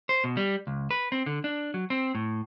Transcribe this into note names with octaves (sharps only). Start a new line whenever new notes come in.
C5
B2
G3
C#2
B4
C4
D3
D4
F#3
C4
A2